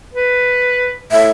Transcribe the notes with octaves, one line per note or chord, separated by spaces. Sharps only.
B4
A2 E5